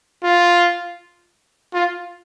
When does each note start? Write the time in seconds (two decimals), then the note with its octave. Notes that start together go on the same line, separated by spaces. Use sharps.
0.23 F4
1.74 F4